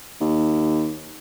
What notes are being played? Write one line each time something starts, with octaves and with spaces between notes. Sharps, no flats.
D#2